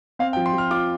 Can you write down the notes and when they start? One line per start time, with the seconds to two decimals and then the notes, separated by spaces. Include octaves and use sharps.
0.19 C4 F5
0.33 G5
0.37 F3
0.46 C6
0.54 F3 F6
0.71 F4 D6